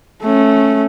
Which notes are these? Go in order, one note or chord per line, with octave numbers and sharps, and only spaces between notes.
A3 C#4